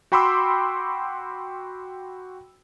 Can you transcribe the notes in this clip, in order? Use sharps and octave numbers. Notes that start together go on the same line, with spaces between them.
F#4 G5 B5 C6 D6 E6